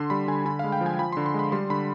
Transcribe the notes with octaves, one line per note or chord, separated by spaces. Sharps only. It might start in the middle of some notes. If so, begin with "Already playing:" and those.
Already playing: D3 C6
G3 B5
D3 G#5
D3 B5
G#3 F5
G5
F3
G#5
F3 B5
D3 C6
C6
G#3 B5
G3 C6
D3 B5